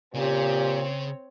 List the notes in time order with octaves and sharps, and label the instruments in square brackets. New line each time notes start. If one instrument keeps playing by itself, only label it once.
[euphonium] A#2 [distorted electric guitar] C#3 [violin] C4 C#5 [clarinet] G4